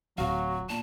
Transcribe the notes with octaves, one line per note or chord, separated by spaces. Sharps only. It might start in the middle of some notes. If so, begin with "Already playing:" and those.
D1 F#3 F#4 F5
A#2 A5 E7